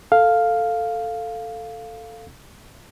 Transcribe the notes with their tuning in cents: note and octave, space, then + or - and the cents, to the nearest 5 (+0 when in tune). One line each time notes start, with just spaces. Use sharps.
A4 +10 F5 +0